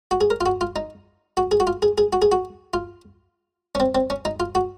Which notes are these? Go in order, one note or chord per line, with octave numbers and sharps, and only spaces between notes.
F#4
G#4
A#4
F4
F#4
F4
D#4
F#4
G#4
F#4
F4
G#4
G#4
F#4
G#4
F#4
F4
C#4
C4
C4
C#4
D#4
F4
F#4